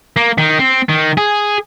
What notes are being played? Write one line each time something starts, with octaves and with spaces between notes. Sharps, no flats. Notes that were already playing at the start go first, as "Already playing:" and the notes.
A#3
D#3
C4
D#3
G#4